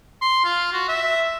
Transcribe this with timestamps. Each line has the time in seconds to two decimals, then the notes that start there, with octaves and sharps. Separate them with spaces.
0.22 C6
0.45 F4
0.73 F#4
0.88 E5